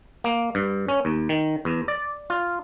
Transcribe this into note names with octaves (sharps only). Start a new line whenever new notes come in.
A#3
G2
C#4
D#2
D#3
E2
D5
F4